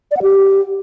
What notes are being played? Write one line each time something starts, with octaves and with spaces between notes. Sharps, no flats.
D5
F#5
G4